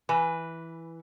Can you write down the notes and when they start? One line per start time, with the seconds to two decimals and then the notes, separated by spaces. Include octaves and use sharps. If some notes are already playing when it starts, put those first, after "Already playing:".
0.09 E3 B4